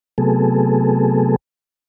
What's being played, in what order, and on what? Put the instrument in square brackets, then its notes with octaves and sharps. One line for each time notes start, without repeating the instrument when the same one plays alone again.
[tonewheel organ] C3 F#3 A3 B3 G#4 A4